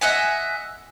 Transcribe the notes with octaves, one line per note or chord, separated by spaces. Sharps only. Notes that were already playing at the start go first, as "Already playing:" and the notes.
D#5 E5 F#5 G#5